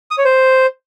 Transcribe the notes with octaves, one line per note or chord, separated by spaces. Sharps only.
D#6
C#5
C5